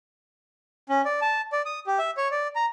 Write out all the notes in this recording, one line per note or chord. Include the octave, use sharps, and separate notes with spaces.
C#4
D5
A5
D5
D#6
G4
E5
C#5
D5
A#5